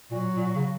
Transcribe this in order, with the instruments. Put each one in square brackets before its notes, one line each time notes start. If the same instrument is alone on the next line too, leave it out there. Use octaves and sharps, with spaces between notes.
[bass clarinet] A#2 [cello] F#3
[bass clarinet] A#2
C#3